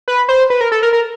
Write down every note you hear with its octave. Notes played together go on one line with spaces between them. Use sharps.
B4
C5
B4
A#4
A4
A#4
A#4